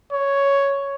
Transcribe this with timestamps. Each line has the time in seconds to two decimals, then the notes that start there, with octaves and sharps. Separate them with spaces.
0.13 C#5